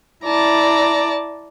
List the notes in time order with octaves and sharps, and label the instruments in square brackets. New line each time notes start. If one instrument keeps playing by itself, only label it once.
[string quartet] E4 D5 A5 A#5